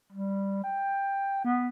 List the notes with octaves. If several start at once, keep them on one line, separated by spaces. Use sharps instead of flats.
G3
G5
B3